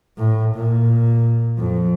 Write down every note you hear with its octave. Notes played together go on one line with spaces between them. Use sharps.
A2
A#2
F2